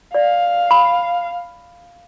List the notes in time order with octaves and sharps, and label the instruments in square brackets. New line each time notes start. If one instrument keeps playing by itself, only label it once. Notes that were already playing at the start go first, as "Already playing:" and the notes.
[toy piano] D5 [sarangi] F5
[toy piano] B5